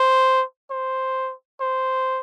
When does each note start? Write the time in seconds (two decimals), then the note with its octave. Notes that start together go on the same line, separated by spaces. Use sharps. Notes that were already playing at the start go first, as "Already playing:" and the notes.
Already playing: C5
0.71 C5
1.61 C5